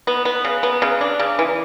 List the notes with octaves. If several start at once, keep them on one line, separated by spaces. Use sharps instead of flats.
B3
B3
C#3
B3
C#3
D4
C#3
E3